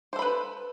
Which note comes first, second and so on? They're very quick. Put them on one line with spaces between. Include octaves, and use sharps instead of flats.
C5 A4 B5 B4